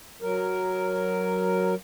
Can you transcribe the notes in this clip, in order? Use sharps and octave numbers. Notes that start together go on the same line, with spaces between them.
F#3 A#4